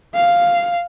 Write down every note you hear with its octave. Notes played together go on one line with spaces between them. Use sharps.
F5